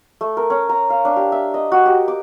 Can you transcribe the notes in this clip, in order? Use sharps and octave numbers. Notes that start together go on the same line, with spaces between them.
A3
A#4
C#4
A#5
F5
D4
G4
E5
D#5
F#4
G4
D6